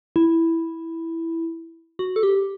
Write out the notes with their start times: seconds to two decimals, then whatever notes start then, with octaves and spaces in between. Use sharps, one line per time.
0.16 E4
1.99 F#4
2.16 A4
2.23 G4